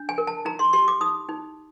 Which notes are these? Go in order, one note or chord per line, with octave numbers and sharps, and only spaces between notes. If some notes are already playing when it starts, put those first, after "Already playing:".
Already playing: D4
G#5
A#4
A5
D#4 A#5
C6
G4 C6
D6
D#4 D#6
D#4